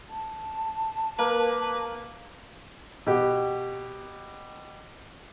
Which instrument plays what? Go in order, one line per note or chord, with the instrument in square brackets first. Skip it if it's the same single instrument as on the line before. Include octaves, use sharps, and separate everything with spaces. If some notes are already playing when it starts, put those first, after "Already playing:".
[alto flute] A5
[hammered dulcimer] A#3 [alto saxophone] B4
[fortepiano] B2 G4